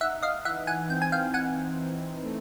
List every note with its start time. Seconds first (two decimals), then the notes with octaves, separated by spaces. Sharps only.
0.01 D#4 E5 F#5
0.23 D#5 F5
0.45 E3 E5 F#5
0.67 F#5 G#5
0.89 C4 G5
1.02 G#5
1.12 F5 G5
1.34 E3 F#5 G#5
1.79 E3
2.23 A3